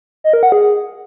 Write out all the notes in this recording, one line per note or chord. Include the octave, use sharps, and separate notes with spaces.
D#5
A#4
F#5
G#4